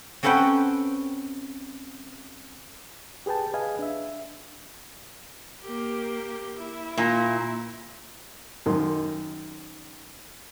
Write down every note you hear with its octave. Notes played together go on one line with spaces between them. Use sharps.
C4 C#4 A4 B4 F#5 G5
G4 G#4 B4 G5 A5
G#4 B4 D#5 F5 G#5
D4 E5
A#3 G4
E4
A#2
F#2 D#3 C6